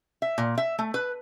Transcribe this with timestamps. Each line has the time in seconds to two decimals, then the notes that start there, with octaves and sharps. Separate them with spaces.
0.22 E5
0.38 A#2
0.58 E5
0.79 A3
0.94 B4